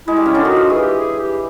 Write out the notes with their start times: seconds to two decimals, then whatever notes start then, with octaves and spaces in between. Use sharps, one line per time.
0.07 G#3 E4
0.17 G3
0.26 C#3 C#4
0.34 D3 D4
0.45 D#3 D#4 F#4
0.56 F3 F4
0.70 E3 E4 G#4
0.82 G4
1.00 G#4
1.19 G4